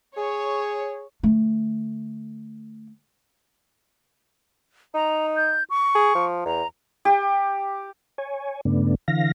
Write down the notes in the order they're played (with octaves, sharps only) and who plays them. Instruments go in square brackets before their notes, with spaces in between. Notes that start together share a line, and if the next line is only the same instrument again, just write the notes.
[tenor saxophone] G#4 [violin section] C#5
[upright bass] D3 A3
[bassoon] D#4 [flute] A#5
[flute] G6
C#6
[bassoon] G#4
F3
[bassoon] E2 [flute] A#5
[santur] G4
[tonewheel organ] C#5 G#5
G2 C#3 A3 B3 D4
D3 E3 F5 A#6